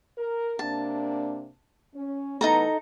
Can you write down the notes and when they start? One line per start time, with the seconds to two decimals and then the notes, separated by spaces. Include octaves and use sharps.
0.18 A#4
0.59 C3 A#3 D4 A5
1.95 C#4
2.41 E3 A3 B3 D#4 A4 A#5